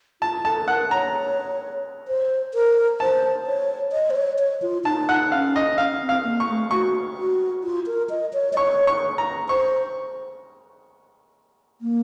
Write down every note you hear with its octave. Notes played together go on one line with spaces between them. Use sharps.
F4 A5
A4 A5
A#4 F#5
C#5 A#5
C5
A#4
C5 A5
C#5
D#5
C5
C#5
C#5
F4
D#4 A5
F#5
C#4 F5
D#5
C#4 F5
C4
F5
A#3
C#6
A3
F#4 C#6
F#4
F4
A#4
D#5
C#5
D#5
C#5 C#6
C#6
A#5
C5 C#6
A#3